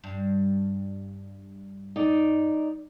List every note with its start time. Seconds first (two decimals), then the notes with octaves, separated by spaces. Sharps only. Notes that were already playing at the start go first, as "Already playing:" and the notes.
0.04 G2
1.96 D#4 D5